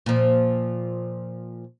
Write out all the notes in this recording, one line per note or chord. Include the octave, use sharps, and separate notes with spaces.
A#2 F3